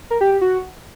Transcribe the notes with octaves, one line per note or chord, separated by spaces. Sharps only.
A#4
G4
G4
F#4